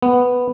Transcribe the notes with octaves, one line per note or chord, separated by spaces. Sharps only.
B3